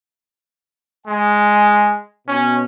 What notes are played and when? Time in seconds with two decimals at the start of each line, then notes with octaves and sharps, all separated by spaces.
1.07 G#3 G#5
2.28 B2 C#4